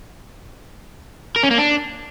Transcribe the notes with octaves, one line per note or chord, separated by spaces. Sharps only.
A#4
C#4
A#3
D4